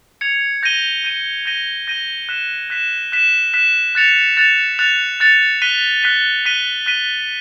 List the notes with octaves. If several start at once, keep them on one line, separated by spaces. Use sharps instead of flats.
G#6 C#7 F7
G6 A#6 D#7 G7
G6 A#6 D#7 G7
G6 A#6 D#7 G7
G6 A#6 D#7 G7
F#6 B6 E7
F#6 B6 E7
F#6 B6 E7
F#6 B6 E7
F#6 A6 C#7 F7
F#6 A6 C#7 F7
F#6 A6 C#7 F7
F#6 A6 C#7 F7
F#6 B6 D#7 G7
F#6 B6 D#7 G7
F#6 B6 D#7 G7
F#6 B6 D#7 G7